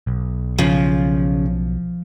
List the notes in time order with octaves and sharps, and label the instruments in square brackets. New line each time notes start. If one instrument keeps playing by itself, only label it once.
[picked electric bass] B1
[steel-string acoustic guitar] C#3 [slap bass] F3